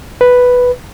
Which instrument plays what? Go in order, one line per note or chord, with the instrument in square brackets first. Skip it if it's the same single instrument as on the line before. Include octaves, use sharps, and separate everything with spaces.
[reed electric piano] B4